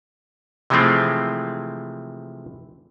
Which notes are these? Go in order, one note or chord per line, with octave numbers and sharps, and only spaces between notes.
C3 E3 F3 G#3 A3 C4